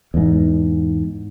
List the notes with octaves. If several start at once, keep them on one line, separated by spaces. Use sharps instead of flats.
E2 G#2